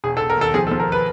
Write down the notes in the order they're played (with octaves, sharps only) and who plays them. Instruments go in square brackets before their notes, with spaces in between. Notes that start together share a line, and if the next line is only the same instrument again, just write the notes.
[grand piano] E1 G#4
A4
E1
A#4
D#2 A4
F3 G#4
A4
F3
A#4
B4